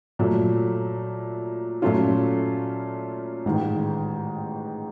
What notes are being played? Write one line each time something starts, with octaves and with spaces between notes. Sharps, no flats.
A#2 F#3 A3
A#2 F#3 A3 C#4 F4
A1 G#2 D#3